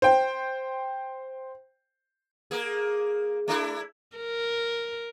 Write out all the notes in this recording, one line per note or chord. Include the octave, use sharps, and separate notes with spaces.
C5 G5
A#3 G#4
A3 D4 E4
A#4